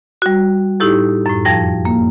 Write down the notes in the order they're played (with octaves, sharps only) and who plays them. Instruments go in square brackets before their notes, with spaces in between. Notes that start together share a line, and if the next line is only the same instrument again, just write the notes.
[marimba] G3 F#4
A2 D#4 E4 G4 A4
F#2 A2
F2 F3 G5 A#6
A#3